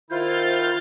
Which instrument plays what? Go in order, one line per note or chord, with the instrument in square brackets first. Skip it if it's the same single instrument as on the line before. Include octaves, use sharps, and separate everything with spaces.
[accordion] D#3 E4 [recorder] F4 [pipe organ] C5 [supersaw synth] F6 G6 A6